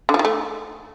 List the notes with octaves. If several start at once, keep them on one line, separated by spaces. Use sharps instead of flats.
D3
F3
D#3
A3